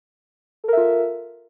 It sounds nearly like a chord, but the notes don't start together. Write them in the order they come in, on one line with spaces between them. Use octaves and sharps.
A4 A#4 E5 F4